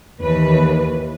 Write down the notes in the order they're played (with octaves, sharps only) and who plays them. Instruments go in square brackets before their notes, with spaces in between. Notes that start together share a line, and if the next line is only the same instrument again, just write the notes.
[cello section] D#2 E3 B4